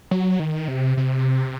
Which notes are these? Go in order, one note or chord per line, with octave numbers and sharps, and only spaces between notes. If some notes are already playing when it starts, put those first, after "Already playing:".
F#3
D#3
C3
C3